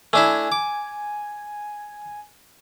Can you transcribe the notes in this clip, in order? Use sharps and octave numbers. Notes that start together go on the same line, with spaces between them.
A3 D4 E4 G#5
D6